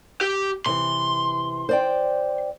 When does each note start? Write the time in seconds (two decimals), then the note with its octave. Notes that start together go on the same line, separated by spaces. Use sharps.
0.21 G4
0.66 C3 E3 C6
1.69 C5 D5 G5